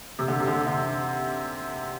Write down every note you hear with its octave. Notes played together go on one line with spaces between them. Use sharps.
C3
D3
C3
D3
D3